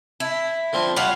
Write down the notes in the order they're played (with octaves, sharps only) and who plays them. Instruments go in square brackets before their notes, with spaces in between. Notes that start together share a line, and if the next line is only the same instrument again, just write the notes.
[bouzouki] E4
[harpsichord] D3 F3 C4
[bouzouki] G3 F5 F#5 [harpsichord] F4 C#5